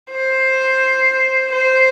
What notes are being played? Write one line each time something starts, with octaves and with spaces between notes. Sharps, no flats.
C5
C5